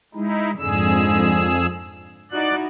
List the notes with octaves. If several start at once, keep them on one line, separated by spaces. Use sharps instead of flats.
G#3 D#4 E4
F2 G#2 D3 G#4 E6
D#4 E4 F#4 D5 F#6